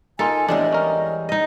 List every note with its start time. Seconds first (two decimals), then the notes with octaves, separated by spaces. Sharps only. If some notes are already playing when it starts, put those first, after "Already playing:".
0.19 A#3 D#4 F4 A4 G#5
0.48 E2 A2 G3 G#3 D4 D#5
0.73 C#4 A#4
1.29 D#4 D#5